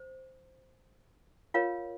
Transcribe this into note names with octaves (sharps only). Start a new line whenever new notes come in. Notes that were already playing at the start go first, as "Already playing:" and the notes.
Already playing: C5
F4 A#4 C#5 F5